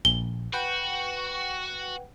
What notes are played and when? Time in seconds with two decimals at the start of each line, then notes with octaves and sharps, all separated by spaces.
0.05 A#1 G7
0.53 F#4 B4 F#5 G5